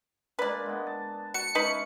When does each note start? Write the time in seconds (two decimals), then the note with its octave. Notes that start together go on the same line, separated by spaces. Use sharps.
0.39 G#3 A#3 D4 B4 D5
0.66 G#3 B3
0.87 A5
1.34 F#4 C#7
1.55 G#3 C#4 D#4 B4 E5 B5